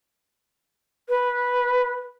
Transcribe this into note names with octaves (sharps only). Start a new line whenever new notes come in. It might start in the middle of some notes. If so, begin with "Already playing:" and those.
B4